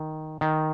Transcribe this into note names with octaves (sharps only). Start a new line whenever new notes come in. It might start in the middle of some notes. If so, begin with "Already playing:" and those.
Already playing: D#3
D#3